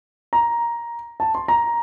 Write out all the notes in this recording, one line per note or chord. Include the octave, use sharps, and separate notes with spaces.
A#5
A5
C6
A#5